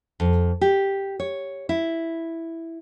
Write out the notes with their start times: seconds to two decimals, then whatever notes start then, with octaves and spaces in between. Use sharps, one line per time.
0.20 F2
0.61 G4
1.20 C#5
1.69 E4